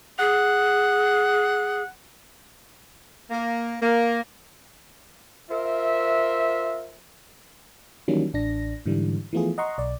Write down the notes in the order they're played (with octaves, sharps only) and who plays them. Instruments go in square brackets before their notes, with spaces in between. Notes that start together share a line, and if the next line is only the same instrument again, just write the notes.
[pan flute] G#4 [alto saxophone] F#5
[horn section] A#3
A#3
F4 A#4 C5 E5
[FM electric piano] D#3 E3 F#3 G3 A#3 C#4
A1 D4 A#6
G#2 D3 E3 G3
E3 F3 A3 B3 F4 G#4
D#5 F#5 A#5 C6 C#6
B1 D5